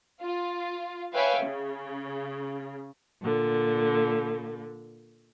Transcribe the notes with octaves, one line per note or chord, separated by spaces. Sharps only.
F4
B4 C#5 E5 F5 G5 G#5
C#3
A#2 D3